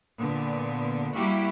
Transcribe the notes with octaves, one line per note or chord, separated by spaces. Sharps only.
A#2 D3 B3
G3 A#3 E4 F#4 G4 E5